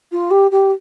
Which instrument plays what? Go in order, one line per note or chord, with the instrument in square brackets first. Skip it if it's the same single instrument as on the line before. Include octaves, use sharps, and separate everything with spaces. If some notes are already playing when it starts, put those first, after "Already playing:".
[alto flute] F4
G4
G4